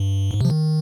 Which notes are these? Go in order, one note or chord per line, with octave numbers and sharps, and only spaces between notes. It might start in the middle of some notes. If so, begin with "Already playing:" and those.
Already playing: G2
G#2
C3 F3
D#3